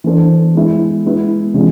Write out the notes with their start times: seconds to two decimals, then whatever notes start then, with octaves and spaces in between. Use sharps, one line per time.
0.04 E3 B3 D4 A4 C5
0.55 G#3 B3 E4
1.04 G#3 B3 E4
1.54 C3 E3 G#3 D4 F4